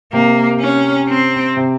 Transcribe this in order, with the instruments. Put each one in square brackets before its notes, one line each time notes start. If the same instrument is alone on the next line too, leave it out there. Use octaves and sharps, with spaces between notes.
[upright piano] C3 [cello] A#3
[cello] C#4
C4
[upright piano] C3